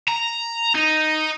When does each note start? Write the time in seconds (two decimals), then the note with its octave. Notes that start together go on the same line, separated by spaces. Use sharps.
0.08 A#5
0.75 D#4